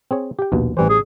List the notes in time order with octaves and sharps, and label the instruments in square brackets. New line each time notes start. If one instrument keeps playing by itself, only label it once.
[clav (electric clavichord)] C4 G#4 C#5
G4 G5
A#1 D#2 B2
[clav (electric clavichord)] A1 G3 C5 [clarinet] E3
[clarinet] G#4